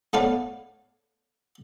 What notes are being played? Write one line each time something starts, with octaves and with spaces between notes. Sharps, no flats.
A3 B3 C#5 D5 F5